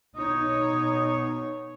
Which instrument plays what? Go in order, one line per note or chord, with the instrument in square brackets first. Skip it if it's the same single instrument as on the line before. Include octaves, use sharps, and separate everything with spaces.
[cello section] B2 C#5 [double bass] D#4